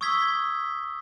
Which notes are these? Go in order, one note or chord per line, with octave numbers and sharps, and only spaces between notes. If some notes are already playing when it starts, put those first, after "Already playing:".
C#6 D#6 E6 G#6 B6 G7